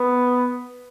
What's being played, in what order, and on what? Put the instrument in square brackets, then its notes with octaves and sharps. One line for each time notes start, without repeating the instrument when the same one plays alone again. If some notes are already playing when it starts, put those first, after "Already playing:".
Already playing: [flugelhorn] B3